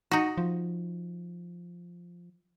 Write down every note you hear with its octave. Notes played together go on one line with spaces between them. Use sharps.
D#4 F#4
F3